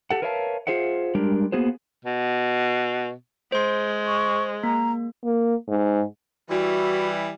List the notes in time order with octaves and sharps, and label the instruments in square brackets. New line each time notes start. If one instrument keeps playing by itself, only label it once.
[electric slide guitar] G4 A4 F#5
A#4 B4 C#5 E5 F5 A5
F4 G#4 C5 E5 F#5
G3 G#3 D4 G4 A#4
A#3 B3 F#4 G#4 C5
[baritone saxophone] B2
[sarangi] G#3 [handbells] C5 C6
[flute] C#6
[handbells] A#3 [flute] A#5
[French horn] A#3
G#2
[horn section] E3 G3 E4 [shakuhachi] F#4